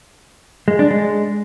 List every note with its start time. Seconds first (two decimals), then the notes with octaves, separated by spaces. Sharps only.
0.68 G#3
0.79 D4
0.91 G#3